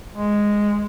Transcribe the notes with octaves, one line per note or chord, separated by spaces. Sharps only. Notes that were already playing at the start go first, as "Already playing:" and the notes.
G#3